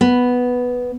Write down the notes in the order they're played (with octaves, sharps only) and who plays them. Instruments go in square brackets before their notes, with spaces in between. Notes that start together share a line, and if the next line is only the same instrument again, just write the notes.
[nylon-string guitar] B3